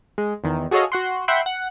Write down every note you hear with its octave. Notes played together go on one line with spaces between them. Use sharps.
G#3
E2 D#3
F#4 G#4 A4 C#5 D#5 F5
F#4 F#5 C6
E5 F#5 G5 B5 C6
F#5